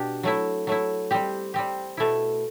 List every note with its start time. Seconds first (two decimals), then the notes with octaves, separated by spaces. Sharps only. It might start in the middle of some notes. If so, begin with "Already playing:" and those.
Already playing: B2 D4 G4
0.23 F#3 A3 E4
0.67 F#3 A3 E4
1.11 G3 C4 G4
1.54 G3 C4 G4
1.97 B2 A3 E4